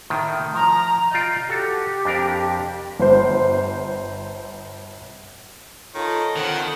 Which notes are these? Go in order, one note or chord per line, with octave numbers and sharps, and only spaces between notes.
A2 D#3
F3 A#5
F4 D5 D#5 G6
F#4 G4 A4
F2 D4 A#4
G1 C5
D#3 F4 A4 C#5 D#5
F2 D3 D#3 F#5